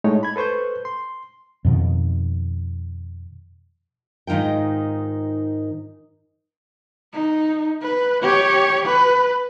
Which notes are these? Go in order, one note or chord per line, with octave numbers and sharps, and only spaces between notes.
A2 G#3 A3 D#4 C#5
B5 G#6
A4 B4 C5 C#6 G6
C6
F2 B2 D#3
G#2 D#3 D#4 F4 G5
D#4
B4
G4 C#5
B4